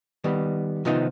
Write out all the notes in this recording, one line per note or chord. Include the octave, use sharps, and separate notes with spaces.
D#3 G3 B3
C3 D#3 F3 B3 D#4 F4